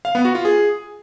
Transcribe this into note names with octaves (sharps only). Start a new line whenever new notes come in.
F5
B3
F#4
F4
G#4